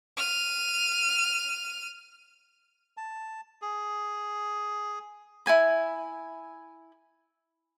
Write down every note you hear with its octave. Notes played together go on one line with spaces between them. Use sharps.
F6 D#7
A5
G#4
E4 F#4 G#5 B5